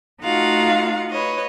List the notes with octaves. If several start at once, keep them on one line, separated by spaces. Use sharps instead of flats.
A3 D#4 F4 F#4 F5 F#5
B4 C#5 D#5